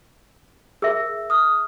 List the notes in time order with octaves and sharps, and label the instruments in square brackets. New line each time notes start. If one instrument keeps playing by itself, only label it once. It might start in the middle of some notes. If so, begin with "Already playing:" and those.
[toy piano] G#4 E5 [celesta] A#4 E6
[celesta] D#6 F6